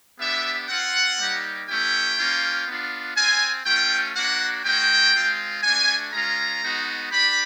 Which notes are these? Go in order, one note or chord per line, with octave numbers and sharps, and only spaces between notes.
B3 D4 G4 E5
C4 F4 F#5
G3 A#3 D#4 G4
A3 C#4 E4 G4 G5
A#3 C#4 F4
B3 D4 F4
C4 F4 G#5
A3 C#4 F4 G5
A#3 D4 F#4 F#5
G#3 C#4 F#4 G5
G#3 C4 F4
A3 D4 F#4 G#5
G#3 C#4 F4 A#5
G#3 B3 D#4 F#4
D4 G4 B5